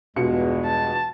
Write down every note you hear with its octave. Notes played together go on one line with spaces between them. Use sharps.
E2 G2 B2 G#3 F4 C#7
A5